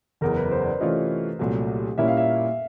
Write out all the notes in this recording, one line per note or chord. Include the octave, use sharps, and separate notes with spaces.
F#1 E2 C#3 A#4
B4
C5
D5
C3 E3 A3 C#4 F4 D#5
C2 A#2 F#3 A3
A#2 G3 A#3 C#4 E4 E5
F5
E5